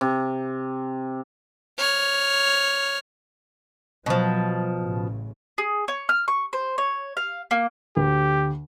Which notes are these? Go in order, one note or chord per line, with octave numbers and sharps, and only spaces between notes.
C3
C#5 F6
B2 F3 F#3
A1 C#3
G#4
C#5
F6
C#6
C5
C#5
F5
A#3
D2 G4